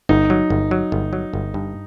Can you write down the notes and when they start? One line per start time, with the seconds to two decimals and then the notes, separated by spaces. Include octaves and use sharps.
0.09 G1 D#4
0.30 F#3
0.50 G1
0.71 F#3
0.92 G1
1.13 F#3
1.33 G1
1.54 G2